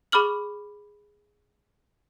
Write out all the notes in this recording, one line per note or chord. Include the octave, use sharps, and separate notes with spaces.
G#4 B5 D6 F6 F#7